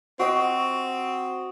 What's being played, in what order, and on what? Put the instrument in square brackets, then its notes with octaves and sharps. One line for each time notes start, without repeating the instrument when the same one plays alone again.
[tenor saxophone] C4 [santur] F#4 D#5